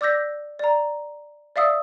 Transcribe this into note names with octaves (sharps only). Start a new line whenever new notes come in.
D5 D6 E6 G6 A#6 B6
D5 A#5
D5 E5 F5 D#6 E6